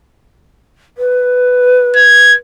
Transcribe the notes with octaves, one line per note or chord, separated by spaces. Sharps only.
B4
G#6